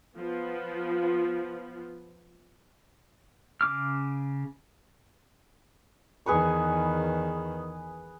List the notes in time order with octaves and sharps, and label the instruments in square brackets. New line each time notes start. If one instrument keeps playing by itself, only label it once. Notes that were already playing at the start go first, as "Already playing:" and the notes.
[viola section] F3 B3
[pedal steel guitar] C#3 D4 D6 F6
[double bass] E2 D#3 [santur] G#4 B4 C#6